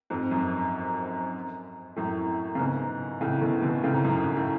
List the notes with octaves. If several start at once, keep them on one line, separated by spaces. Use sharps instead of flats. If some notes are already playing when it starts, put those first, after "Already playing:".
F2 G#2
F#2
F#2 A2
C#3
G#2 B2
A2 C#3
B2 D3
B2 D3
A2 C#3
G#2
F#2
F#2
A2